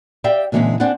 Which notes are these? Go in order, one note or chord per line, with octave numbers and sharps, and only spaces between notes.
G4 D5 E5 F5 G5
A#2 D3 E3 G#3 C4 C#4
C4 D4 G#4 D5 F#5